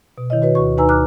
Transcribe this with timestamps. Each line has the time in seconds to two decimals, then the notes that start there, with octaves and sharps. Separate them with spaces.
0.18 B2
0.30 D#3 E4 C#5 D#5
0.42 F#4 B4 C#5
0.55 D2 F#4 C#6
0.77 D2 D#4 B4 G#5 A#5 E6
0.89 A#5 D6 F6 F#6